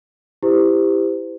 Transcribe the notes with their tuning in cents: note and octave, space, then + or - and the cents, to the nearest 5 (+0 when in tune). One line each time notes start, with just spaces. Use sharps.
E4 +0 G4 +10 C5 -40